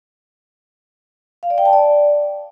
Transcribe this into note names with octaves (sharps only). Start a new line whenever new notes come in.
F5
D5
G5
A5
D5